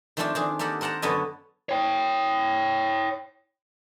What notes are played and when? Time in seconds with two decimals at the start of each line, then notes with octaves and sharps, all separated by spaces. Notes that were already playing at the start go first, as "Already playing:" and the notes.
0.17 D#3 F3 A3 C4 D4 F4
0.35 D#3 D4 G#4
0.59 A#3 G4 A4 A#4 F#5
0.81 A#4 C5 F#5 A5 A#5
1.02 F#2 D3 B3 A4 C#5 D#5
1.69 C#5 G5